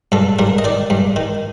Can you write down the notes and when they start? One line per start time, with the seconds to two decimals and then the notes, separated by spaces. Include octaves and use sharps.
0.12 G2 A4
0.39 G2 A#4
0.58 D#5
0.64 D#3 D5
0.90 G2
1.16 D#3